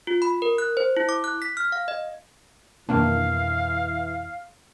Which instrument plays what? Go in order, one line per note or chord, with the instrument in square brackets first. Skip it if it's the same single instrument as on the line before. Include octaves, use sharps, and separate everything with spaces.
[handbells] F4
B5
A#4
F#6
C5
E4
D6
F#6
B6
F6
F5
D#5
[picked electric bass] F2 B2 B3 [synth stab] D#3 A#3 D4 [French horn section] E3 [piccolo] F5